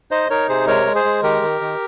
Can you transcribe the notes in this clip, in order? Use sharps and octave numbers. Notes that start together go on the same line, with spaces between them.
D#4 C5 D#5
D#4 A#4 C#5
C3 G#4 C5
G#3 A#4 C#5
G#3
G#4 C5
G#3
D#3 G4 A#4
D#3
D#3